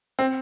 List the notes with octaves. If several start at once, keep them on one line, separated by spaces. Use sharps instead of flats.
C4